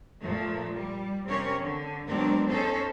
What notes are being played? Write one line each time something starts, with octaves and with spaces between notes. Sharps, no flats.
A#2 F3 A3
G3
C3 C4 C#4 A#4 C#5
D3
B2 F#3 G#3 C4 D4 A#4
C#4 D#4 G#4 A4 C5